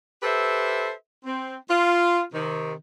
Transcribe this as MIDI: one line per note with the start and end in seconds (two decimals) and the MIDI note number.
0.22 0.91 67
0.22 0.91 69
0.22 0.91 71
0.22 0.91 72
0.22 0.91 76
1.25 1.56 60
1.69 2.20 65
2.33 2.73 48
2.33 2.73 51